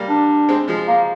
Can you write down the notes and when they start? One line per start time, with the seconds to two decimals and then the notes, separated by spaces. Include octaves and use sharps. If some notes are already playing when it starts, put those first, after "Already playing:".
Already playing: G3 A#3
0.09 D4
0.49 G#3 C4
0.68 F3 G#3
0.88 A#3